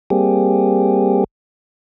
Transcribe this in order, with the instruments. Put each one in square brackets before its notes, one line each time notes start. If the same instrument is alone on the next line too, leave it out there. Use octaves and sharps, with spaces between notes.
[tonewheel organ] G3 A#3 C4 G4 G#4